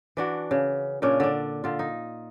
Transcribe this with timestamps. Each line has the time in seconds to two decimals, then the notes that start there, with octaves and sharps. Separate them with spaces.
0.17 E3 D4 F#4
0.51 C#3
1.02 A#2 C#3 C#4 D4
1.20 D3 D4
1.64 D3 F4
1.79 D#4